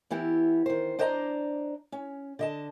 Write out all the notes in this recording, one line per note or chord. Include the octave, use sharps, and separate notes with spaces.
E3 B3 E4 G4
D#3 C5
D4 C5 D5 D#5 A5 A#5
C#4
D3 D#5 A5